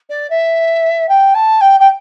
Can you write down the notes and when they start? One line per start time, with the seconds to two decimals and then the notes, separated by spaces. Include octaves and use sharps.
0.09 D5
0.30 E5
1.09 G5
1.34 A5
1.61 G5
1.80 G5